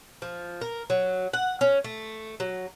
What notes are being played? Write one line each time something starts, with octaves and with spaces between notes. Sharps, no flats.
F3
A#4
F#3
F#5
C#4
A3
F#3